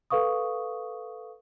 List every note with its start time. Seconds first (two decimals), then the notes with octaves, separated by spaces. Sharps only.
0.10 A4 B4 F5 C#6 D#6